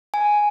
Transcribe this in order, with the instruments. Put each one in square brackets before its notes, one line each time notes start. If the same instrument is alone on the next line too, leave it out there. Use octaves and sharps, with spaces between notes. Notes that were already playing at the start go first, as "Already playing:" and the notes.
[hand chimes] G#5